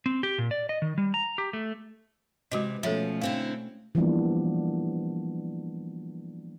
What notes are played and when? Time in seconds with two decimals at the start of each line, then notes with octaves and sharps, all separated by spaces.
0.06 C4
0.23 G4
0.38 A#2
0.51 D5
0.69 D#5
0.82 D#3
0.98 G3
1.14 A#5
1.38 G4
1.53 A3
2.52 C3 E3 G#3 F#4 D#5
2.83 B2 F3 A3 C#4 A4 C#5 E5
3.21 D3 C4 E4 F5
3.95 E3 F3 G3 A#3 B3 D4